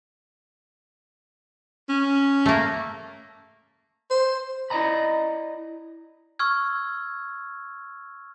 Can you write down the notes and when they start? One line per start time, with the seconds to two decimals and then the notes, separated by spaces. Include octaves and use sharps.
1.89 C#4
2.46 A3 A#3
4.11 C5
4.70 E4 D5 D#5 A#5 B5
6.39 C#6 E6 F6 G#6